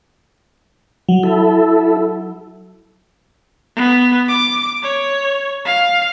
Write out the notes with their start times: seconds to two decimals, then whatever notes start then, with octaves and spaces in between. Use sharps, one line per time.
1.09 F#3
1.23 E4 A4
3.76 B3
4.29 D6
4.83 C#5
5.66 F5